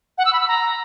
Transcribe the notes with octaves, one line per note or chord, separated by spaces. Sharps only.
F#5
E6
B5
E6
A#5